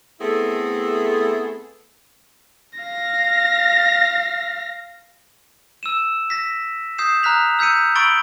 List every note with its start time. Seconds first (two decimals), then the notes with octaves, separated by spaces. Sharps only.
0.21 A3 B3 C4 E4 G#4 A4
2.79 F5 A#6
5.83 E6 D#7 E7
6.30 A#6 B6
6.98 D#6 G6 C7 E7
7.23 A#5 F6 F#6 B6 F7
7.59 E6 G6 B6 C#7 D#7
7.95 B5 C#6 E6 A6 D7 G7